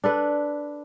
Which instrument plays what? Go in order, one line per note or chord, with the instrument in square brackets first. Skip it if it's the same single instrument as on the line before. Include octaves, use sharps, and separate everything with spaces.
[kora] D4 A4 B4